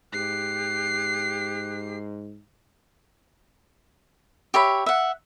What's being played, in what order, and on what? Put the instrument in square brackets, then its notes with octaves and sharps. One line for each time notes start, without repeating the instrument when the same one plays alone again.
[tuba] G#2 [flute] G4 [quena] F#6 [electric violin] C7
[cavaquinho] G4 C#5 E5 B5
E5 F#5